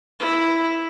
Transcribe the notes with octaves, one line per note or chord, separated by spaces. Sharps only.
E4